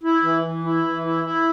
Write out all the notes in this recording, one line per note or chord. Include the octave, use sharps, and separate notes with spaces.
E4
E3
E3
E4
E3
E4
E4